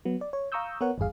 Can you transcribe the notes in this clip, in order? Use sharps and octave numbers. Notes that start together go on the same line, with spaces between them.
F#3 B3
D5
C#5
F5 A#5 C#6 D#6 E6 G6
B3 A#4 C#5 F#5
G#1 E2 G2 G#4 F5